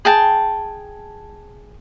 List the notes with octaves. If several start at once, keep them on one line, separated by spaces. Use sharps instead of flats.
G#4 G5 A5